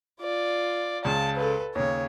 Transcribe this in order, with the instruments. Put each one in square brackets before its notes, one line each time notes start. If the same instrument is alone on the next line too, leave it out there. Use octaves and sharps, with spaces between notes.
[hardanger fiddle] F4 D5
[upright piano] C#2 C#3 [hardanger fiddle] A5
[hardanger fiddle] A4 B4
[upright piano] D#2 C#3 [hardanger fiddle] C#5